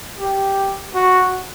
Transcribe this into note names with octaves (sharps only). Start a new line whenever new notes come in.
G4
F#4